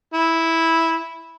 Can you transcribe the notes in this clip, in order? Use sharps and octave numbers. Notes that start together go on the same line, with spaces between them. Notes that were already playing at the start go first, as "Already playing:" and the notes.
E4